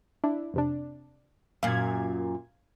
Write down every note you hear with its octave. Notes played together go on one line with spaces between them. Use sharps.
D4 E4
F2 C3 D4
F#2 A#2 F5 G#6